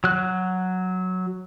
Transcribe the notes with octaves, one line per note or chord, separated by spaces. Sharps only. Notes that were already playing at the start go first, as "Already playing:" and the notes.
F#3 F#6